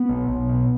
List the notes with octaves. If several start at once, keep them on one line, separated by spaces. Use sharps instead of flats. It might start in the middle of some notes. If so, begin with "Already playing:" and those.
Already playing: B3
B1
B1
B2